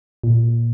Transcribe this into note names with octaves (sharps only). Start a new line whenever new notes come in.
A#2